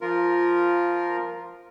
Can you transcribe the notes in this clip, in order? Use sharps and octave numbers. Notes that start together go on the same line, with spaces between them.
F3 F4 A#4